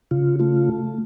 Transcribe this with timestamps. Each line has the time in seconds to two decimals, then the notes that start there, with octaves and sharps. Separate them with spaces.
0.11 C#3 F4
0.39 A3 F4